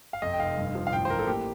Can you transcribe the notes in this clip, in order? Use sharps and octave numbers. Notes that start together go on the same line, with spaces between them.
F5
F2 D#5
G5
F1 F5
G2
F3
F5
A1 G5
C5
A1 A#4
A4
A#3 G4